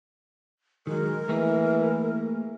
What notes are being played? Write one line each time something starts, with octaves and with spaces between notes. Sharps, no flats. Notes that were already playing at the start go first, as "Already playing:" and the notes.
D#3 F#3 G#3 A#4
E3 A3 A#3 G#4